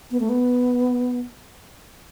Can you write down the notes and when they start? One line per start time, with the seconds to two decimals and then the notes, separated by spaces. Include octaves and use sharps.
0.11 B3
0.20 A3
0.29 B3